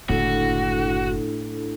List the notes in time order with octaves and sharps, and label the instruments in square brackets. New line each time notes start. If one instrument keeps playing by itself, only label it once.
[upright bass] F#1 D3 [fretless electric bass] A2 [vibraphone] D4 E4 A4 [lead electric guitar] F#4